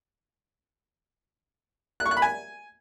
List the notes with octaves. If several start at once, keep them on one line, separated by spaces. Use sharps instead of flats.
F#6
C#6
F#6
B5
G#5